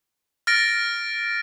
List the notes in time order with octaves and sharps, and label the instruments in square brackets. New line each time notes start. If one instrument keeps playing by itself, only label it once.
[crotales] F6 A6 A#6 D7